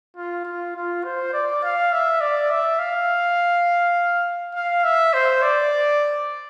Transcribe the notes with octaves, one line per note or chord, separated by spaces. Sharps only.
F4
F4
F4
C5
D5
F5
E5
D5
E5
F5
F5
E5
C5
D5